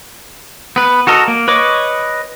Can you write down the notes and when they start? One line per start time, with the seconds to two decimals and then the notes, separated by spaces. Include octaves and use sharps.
0.76 B3 B4
1.07 F#4 A4 A#4 D#5
1.28 A#3
1.48 B4 C#5 D#5 C#6 D6